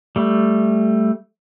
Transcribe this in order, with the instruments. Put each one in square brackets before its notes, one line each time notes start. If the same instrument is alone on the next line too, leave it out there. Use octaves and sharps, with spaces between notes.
[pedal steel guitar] G3 A3